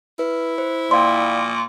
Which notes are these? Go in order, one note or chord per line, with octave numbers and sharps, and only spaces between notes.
E4 B4
C5
A#2 D5 F5 G5 C6